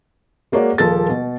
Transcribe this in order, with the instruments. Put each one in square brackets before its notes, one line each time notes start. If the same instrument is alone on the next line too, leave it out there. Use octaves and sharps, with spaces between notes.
[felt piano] G#3 A#3 F#4 C#5 D5
D#1 F3 A#3 G#4 A4 A6
B2